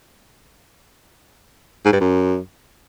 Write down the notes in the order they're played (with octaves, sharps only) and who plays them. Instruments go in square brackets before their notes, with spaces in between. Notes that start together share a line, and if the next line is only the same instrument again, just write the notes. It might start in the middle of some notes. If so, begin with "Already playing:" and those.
[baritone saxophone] G#2
G2
F#2